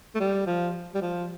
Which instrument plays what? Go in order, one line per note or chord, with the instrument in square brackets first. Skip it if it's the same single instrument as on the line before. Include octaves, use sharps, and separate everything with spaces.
[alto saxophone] A3
G3
F3
G3
F3